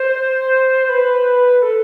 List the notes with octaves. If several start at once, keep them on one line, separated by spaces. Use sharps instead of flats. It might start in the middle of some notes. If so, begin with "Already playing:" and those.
Already playing: C5
C5
B4
B4
A4